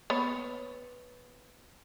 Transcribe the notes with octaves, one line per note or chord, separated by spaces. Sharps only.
B3 C#5